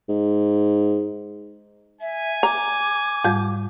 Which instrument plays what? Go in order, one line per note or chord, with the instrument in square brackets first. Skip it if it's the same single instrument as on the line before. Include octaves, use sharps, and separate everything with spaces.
[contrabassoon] G#2
[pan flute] E5 [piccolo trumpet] G#5
[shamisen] A#5 [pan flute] D6
[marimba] G#2 G3 [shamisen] F4